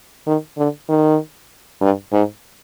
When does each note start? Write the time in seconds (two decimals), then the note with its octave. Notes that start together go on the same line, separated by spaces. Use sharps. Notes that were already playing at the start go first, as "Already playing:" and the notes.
0.26 D#3
0.58 D3
0.89 D#3
1.81 G2
2.13 G#2